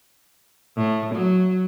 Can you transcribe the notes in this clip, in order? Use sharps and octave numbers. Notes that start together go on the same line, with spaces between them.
A2
F#3